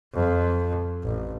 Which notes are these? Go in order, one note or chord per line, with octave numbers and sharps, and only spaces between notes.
F2
A1